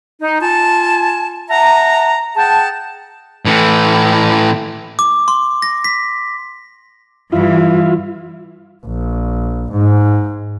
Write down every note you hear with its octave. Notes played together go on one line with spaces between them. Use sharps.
D#4
F4 G#5 A5
E5 F#5 A5 A#5
G#4 F#5 G5 A5
A2 E3
D6
C6
A#6
B6
G2 E3 E4 F4
A#1
G#2